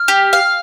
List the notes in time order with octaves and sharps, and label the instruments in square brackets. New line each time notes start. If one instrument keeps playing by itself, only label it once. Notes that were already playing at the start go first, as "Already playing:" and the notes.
Already playing: [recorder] F6
[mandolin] G4
F5